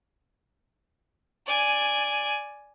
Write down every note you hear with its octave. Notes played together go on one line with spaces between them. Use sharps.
D5 G#5